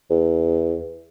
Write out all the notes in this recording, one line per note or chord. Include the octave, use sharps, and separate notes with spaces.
E2